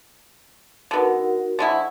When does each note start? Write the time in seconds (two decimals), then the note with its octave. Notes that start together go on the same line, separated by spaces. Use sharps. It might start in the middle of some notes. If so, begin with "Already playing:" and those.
0.91 D3 B3 D#4 F#4 A#4
1.59 D3 G#3 E4 C5 F#5 C#6